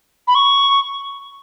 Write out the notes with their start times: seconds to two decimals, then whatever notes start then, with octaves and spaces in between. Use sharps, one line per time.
0.28 B5
0.35 C#6